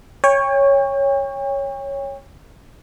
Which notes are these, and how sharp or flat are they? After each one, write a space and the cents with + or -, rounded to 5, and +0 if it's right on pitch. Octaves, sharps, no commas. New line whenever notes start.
C#5 +0 G5 +40